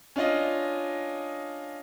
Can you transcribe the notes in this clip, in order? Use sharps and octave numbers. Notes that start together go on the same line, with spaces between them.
C#4 D4 F4 D#5